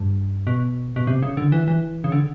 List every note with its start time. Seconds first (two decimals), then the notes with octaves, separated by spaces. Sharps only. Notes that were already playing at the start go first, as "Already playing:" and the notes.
Already playing: G2
0.47 B2
0.96 B2
1.07 C3
1.23 C#3
1.37 D3
1.52 E3
1.68 E3
2.04 C#3
2.12 D3